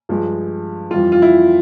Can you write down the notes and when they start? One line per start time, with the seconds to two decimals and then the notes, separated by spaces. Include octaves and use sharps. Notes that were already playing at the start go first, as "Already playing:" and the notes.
0.09 G2 F3 G#3
0.90 F2 E3 G3 F4
1.12 F4
1.22 E4